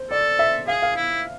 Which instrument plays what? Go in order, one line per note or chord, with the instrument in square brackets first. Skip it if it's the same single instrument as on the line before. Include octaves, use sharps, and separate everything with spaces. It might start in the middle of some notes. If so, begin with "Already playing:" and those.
Already playing: [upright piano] C5
[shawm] A4 [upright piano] D5
[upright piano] E5
[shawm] G#4 [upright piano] F5
[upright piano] F5
[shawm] E4